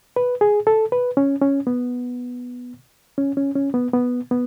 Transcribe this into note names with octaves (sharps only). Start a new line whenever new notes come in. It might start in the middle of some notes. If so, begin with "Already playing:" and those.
B4
G#4
A4
B4
C#4
C#4
B3
C#4
C#4
C#4
B3
B3
B3